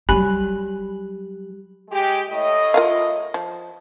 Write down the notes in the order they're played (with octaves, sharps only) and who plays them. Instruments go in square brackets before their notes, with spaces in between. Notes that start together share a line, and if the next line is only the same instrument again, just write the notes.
[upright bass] F#3 G3 [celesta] G4 [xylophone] G#5 B5 F#6
[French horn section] G#3 G4
A2 D#5
[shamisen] F4 A#4 F5
F3